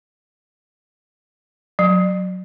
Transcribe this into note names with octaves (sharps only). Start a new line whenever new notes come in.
F#3